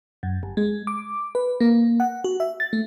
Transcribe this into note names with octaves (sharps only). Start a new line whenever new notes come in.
F#2
G1
G#3
D6
B4
A#3
F#5
F#4
E5
A6
A3